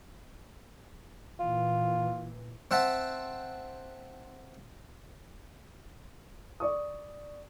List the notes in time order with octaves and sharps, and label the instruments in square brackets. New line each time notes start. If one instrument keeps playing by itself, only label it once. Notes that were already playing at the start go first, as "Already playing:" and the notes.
[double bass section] A#2 E3 [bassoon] F4
[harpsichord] C4 E5 F#5 A5
[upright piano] D5 C#6 D#6